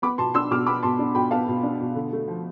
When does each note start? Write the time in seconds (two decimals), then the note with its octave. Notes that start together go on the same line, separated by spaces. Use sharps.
0.02 B3 B5 D6
0.18 B2 A5 C6
0.34 D4 C6 E6
0.51 B2 D6 F6
0.66 B3 B5 D6
0.83 B2 A5 C6
0.99 D4
1.15 B2 G5 B5
1.31 B3 F5 A5
1.48 B2
1.63 D4
1.80 B2
1.95 D3
2.13 A3
2.28 F3